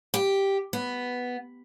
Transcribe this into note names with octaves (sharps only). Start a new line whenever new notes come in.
G4
B3